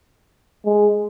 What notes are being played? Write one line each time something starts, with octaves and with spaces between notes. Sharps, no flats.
G#3